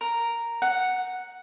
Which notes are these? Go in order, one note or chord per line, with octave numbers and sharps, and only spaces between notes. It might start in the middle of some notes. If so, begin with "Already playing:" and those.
A#4
F#5